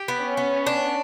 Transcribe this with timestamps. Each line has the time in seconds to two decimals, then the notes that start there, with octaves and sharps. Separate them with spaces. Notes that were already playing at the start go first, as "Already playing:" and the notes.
Already playing: G4
0.08 B3
0.22 C#4
0.37 B3
0.67 D4